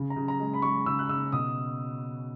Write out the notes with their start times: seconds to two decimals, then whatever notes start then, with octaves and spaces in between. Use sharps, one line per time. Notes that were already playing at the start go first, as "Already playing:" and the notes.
Already playing: C#3
0.10 A#5
0.16 C#3
0.28 A#5
0.39 G#3
0.54 B5
0.62 G#3 C#6
0.86 C#3 E6
0.99 F#6
1.09 C#3 E6
1.32 B2 D#6